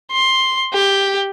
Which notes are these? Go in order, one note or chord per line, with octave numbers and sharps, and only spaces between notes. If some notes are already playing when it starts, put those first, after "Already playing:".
C6
G4